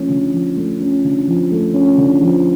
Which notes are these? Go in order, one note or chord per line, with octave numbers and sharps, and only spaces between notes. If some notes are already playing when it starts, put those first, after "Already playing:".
Already playing: F3 A3 C#4
D3
F3
A3
C#4
D3
F3
A3
C#4
D3
F3